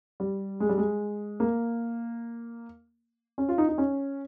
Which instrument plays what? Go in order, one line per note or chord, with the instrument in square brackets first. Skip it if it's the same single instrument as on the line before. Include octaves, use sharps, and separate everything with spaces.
[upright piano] G3
G#3
G3
G#3
A#3
C#4
F4
D#4
D#4
C#4